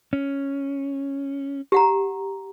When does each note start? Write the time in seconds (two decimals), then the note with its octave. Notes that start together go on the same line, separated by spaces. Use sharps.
0.13 C#4
1.72 G4 F#5 A#5